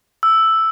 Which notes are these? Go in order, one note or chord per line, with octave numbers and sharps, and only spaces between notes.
E6